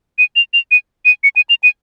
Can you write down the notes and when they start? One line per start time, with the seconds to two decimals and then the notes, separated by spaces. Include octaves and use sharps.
0.18 D#7
0.36 F7
0.53 F7
0.71 D#7
1.05 D#7
1.24 C#7
1.36 D#7
1.49 F7
1.63 D#7